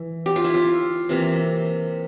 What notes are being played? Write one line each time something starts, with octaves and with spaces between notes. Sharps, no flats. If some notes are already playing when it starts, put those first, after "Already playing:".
Already playing: E3
G4
F4
E4
F4
C3 E3 A#3